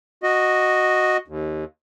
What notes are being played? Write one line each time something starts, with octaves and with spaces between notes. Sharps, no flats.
F#4 D#5
D#2